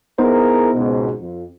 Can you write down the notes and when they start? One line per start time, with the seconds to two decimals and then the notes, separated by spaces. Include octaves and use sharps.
0.18 B3 D#4 E4 G#4 A#4 C5
0.75 C#2 G#2 B2
1.19 F2